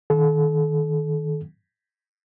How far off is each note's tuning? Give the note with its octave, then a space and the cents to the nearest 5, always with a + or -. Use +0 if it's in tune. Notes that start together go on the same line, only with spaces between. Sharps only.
D#3 +0 A4 -35